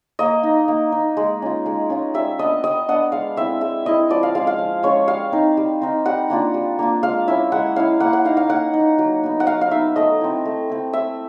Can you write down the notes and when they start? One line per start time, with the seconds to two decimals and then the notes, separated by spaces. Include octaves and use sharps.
0.19 A#3 D#5
0.43 D#4
0.68 A#3
0.92 D#4
1.17 G#3
1.42 C#4 F4
1.66 G#3
1.90 C#4 F4
2.14 G3 E5
2.39 B3 D4 D#5
2.64 G3 D#5
2.88 B3 D4 F#5
3.12 G#3 F5
3.37 C4 E4 E5
3.61 G#3 E5
3.86 C4 E4 D#5
4.10 F3 D5
4.23 F5
4.35 G#3 C#4 F4 F5
4.47 F5
4.58 F3
4.83 G#3 C#4 F4 C#5
5.07 G3 F5
5.32 C4 D#4
5.57 G3
5.82 C4 D#4
6.06 G3 F#5
6.30 A#3 D4 F4
6.54 G3
6.79 A#3 D4 F4
7.03 G#3 F5
7.27 C#4 E4 E5
7.52 G#3 F#5
7.76 C#4 E4 F5
8.00 A#3 F#5
8.13 F#5
8.25 D#4 F5
8.37 F5
8.50 A#3 F#5
8.74 D#4
8.99 F#3
9.24 B3 D#4
9.40 F#5
9.47 F#3 F5
9.61 F5
9.71 B3 D#4 E5
9.96 A3 D#5
10.21 C4 E4
10.45 A3
10.69 C4 E4
10.93 A3 E5